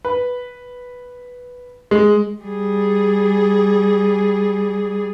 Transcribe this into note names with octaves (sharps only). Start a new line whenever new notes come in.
B4
G#3
G3 G#4